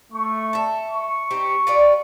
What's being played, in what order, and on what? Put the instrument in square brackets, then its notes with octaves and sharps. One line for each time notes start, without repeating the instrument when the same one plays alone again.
[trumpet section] A3 C#6
[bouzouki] A4 E5
[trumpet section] C#6
[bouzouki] C4 D#4 G4
F4 G4 D5